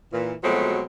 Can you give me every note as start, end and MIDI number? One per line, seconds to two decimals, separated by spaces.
0.13 0.34 46
0.13 0.34 52
0.43 0.83 47
0.43 0.83 53
0.43 0.83 54
0.43 0.83 56
0.43 0.83 57
0.43 0.83 60